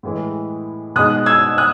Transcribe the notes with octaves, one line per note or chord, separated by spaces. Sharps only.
A2 E3 G#3
B2 G#3 D#4 D#6 F#6
E6 G#6
D#6 F#6